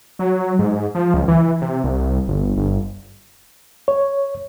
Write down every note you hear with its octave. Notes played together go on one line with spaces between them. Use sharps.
F#3
G#2
F3
C#2
E3
C3
C2
G1
G1
C#5